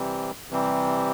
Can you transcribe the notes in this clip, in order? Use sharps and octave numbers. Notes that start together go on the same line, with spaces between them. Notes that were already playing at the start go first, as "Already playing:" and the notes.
Already playing: C3 E3 G3 C4
C3 E3 G3 C4